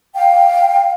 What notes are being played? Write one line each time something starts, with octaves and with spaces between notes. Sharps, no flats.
F5 G5